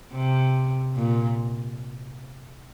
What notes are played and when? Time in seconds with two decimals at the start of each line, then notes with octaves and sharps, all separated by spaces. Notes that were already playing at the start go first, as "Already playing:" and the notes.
0.13 C3
0.96 A#2